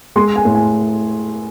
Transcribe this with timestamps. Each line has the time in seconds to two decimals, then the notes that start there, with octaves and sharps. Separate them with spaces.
0.16 G#3 C6
0.36 G#5
0.45 A2
0.55 G#5